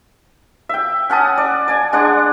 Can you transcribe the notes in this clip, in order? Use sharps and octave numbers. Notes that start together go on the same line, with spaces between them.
E5 G5
C#4 F#5 A5 D#6
D5
D5 G#5
G#3 D4 D5 F#5